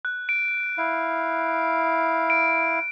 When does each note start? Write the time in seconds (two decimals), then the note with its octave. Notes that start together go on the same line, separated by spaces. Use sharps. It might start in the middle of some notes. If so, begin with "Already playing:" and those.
0.05 F#6
0.29 D7
0.78 E4 F5
2.30 D7